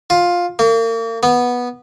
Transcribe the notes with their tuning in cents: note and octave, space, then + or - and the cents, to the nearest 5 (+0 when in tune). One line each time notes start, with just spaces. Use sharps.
F4 +10
A#3 -35
B3 -10